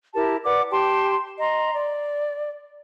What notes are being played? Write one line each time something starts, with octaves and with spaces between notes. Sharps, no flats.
E4 G4 A#4 A5
B4 D5 F#5 D6
G4 G5 A5 C6
D#5 A#5 C6
D5